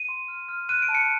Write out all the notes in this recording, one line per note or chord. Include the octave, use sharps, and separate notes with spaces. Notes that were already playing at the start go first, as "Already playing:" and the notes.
Already playing: D#7
C6
F6
F6
F#6 D#7
D7
A5
C#7